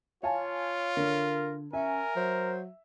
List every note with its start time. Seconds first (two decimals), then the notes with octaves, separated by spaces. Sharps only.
0.23 F4 C#5 F5 G#5 A5
0.97 D3 A#4
1.73 C#4 A#4 E5 G#5
2.16 F#3 C5